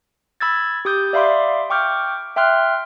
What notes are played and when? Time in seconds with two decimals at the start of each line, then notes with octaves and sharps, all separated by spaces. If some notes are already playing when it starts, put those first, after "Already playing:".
0.40 B5 E6 G#6 A6
0.85 G4 D6 D#6 G6
1.13 D5 E5 F5 B5 C6 D6
1.70 G5 C#6 D6 F6 G6
2.36 E5 G5 C6 F6 F#6